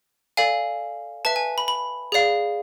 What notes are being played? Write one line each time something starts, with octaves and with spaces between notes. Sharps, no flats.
A4 D5 F5 G#5
B4 E5 A5
G#5
B5
B5
G#4 D5 F5